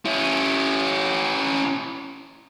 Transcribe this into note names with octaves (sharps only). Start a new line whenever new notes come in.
C#4 E4